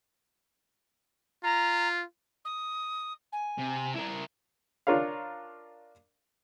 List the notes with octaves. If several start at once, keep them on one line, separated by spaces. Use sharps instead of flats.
F4 A#5
D#6
G#5
C3
E4 A#4
D4 F4 A#4 C#5 F5